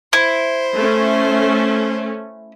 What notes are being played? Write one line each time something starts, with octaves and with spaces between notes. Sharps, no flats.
E4 C5
A3 C#4